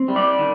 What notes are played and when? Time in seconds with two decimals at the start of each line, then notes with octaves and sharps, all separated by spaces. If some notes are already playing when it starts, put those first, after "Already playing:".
Already playing: C4
0.08 G3
0.16 D5
0.39 D#3